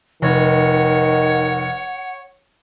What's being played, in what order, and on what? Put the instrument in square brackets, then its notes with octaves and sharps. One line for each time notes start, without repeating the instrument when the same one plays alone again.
[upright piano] F1 [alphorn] D#3 [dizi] C#5 [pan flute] F#5